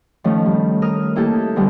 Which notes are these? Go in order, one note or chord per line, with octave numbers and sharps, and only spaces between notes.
D#3 F3 A3 C#4
G3
A#4 D#6 F6
A#3 E4 G4 A4
B2 D3 G3